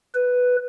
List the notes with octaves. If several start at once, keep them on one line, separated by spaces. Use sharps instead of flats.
B4